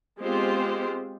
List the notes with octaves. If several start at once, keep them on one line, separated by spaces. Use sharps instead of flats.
G#3 B3 C4 F4 G4 C5